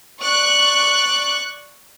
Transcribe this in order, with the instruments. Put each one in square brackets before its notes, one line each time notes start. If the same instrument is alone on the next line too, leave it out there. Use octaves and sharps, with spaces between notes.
[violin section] D5 C#6 F#6